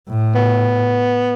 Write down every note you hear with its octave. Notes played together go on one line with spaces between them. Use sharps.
A2
B3